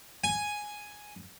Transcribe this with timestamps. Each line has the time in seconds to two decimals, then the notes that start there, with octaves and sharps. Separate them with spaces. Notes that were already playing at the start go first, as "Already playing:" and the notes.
0.24 G#5